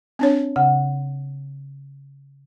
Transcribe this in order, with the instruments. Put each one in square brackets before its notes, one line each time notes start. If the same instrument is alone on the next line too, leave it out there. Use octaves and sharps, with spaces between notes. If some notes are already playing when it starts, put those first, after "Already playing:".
[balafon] C4 D4 C#5
[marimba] C#3 F#5